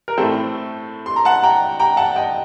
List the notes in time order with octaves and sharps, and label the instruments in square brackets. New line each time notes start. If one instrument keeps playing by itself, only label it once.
[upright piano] A#4
A2 A3 C4 A4 C5
C6
A#5
F#5 A5
G5 A#5
G5 A#5
F#5 A5
D#5 G5